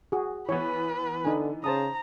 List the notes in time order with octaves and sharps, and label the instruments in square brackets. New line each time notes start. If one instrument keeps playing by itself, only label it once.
[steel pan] F#4 G#4
[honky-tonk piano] E3 B3 [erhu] B4 [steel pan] C#5
[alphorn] D3 [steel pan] D#4 G#5
[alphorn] C#3 [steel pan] C5 A5 D#6 [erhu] A#5